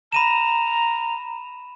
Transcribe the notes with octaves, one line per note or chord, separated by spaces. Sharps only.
A#5 B5 D#7 E7